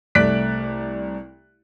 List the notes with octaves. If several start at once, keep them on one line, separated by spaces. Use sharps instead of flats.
C2 A3 D5 F#6 B6 D7